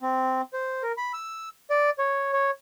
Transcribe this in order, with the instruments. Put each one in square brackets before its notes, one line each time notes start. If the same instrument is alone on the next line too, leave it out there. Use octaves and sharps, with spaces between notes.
[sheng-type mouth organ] C4
C5
A#4
B5
E6
D5
C#5
C#5